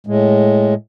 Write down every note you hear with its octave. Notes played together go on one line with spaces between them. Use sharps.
A2 G#3